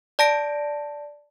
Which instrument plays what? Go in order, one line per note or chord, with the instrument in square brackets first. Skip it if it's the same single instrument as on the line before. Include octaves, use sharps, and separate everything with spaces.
[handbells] D5 A5 A#6 D7